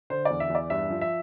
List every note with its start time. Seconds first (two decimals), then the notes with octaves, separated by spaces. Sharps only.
0.10 D3 C5
0.25 E2 D5
0.40 E5
0.50 E2
0.55 D5
0.70 G2 E5
0.90 F3
1.01 E5